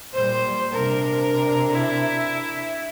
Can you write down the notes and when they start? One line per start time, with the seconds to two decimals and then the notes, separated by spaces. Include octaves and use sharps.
0.13 A#2 G3 C5
0.72 C3 D4 A#4
1.72 E4